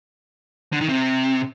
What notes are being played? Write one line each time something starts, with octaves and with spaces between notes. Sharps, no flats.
D3
D#3
C3